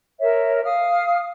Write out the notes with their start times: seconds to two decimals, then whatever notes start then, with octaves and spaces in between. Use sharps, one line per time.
0.20 A#4 C#5 E5
0.64 F5 D#6 F6